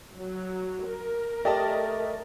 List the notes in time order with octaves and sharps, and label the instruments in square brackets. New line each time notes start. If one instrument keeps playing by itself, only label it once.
[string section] F#3
A#4
[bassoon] A3 [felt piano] G4 [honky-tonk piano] D5 D#5 A5